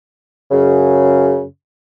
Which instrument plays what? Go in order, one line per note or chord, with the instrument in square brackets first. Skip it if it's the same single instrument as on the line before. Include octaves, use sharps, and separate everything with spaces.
[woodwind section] F#2 C#3